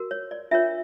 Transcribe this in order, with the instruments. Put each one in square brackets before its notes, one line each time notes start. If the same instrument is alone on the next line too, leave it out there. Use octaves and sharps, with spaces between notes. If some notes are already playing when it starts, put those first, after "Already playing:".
Already playing: [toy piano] F#4 A#4
C#5
D5
D4 F4 A#4 C#5 E5